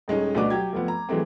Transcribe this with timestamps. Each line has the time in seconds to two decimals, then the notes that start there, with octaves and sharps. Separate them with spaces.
0.08 D#1 G#3 C#4 D#4
0.35 D2 B2 D4 F#4 D#5 D6
0.50 F#3 G4 G#6
0.73 F1 F3 B3
0.88 A#5
1.09 E3 F#3 G#3 A3 C4